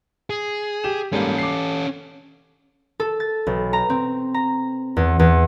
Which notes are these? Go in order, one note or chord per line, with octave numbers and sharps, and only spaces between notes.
G#4
G4 E7
G#2 G3 A#3 C#4 A4
D6 C7
A4
A6
B1
A#5
C4
A#5
E2
E2